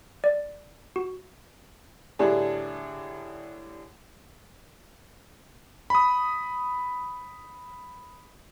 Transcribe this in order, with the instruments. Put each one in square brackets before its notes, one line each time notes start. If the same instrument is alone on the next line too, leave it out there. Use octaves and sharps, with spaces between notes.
[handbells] D5
F#4
[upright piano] A2 D3 G3 D4 G#4
[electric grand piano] B5 D#6